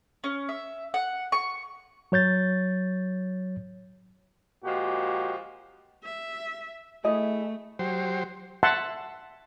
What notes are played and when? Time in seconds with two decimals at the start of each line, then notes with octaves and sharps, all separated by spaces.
0.24 C#4
0.49 E5
0.94 F#5
1.32 C#6
2.12 F#3 C#5 G6 A6
4.64 A#2 F3 G#3 F#4 G4
6.04 E5
7.04 A3 E4 G#4 D#5
7.79 F#3 G4 C5
8.63 E5 F#5 A5 C6